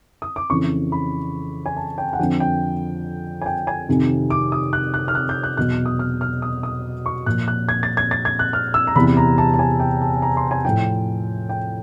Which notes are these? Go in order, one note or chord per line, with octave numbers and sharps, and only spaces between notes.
D#6
D6
F2 C#3 E3 C#6
B5
G#5
A5
G5
F#5
F2 D3 F3 G5
G5
G#5
G5
G#5
F2 C3 D#3
D6
D#6
F#6
F#6
F6
F#6
G6
F#6
E2 B2 F#3 F#6
D#6
F6
F6
D#6
D#6
C#6
A#2 F3 F#6
F#6
G#6
A6
G#6
A6
G#6
F#6
F6
E6
A#5
E2 C3 E3 B5
A#5
A5
A5
G#5
G5
A5
A#5
C6
G#5
A2 F3 G5
G5